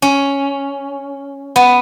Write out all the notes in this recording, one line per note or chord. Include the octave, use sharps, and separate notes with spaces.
C#4
B3